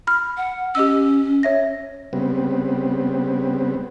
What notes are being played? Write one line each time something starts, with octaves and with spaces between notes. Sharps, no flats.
B5 F6
F#5
C#4 G4 D#5 E6
C#5 E5 A#6
C#3 G3 B3 C4